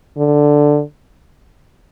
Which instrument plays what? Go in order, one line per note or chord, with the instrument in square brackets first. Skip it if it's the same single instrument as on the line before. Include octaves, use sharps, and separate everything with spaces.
[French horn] D3